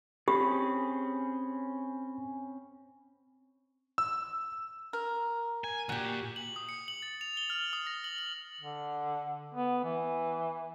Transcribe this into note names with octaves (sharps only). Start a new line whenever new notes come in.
C4 C#4 G4 G#4 B5
E6
A#4
G#5
D#2 A#2 F#4 G4
F#7
D#6
C#7
F#7
A6
F7
G7
F6
D#6
A#6
F#7
F#7
D3
B3
E3